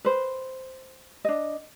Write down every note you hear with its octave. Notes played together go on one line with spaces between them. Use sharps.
B4 C5
D4 D#5